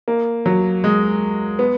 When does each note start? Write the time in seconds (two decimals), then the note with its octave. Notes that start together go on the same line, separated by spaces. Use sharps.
0.08 A#3
0.46 F#3
0.84 G#3
1.59 B3